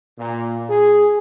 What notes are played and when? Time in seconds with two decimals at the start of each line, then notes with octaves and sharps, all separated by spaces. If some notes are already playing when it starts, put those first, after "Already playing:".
0.19 A#2
0.69 G#4